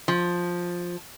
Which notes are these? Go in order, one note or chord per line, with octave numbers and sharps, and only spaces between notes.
F3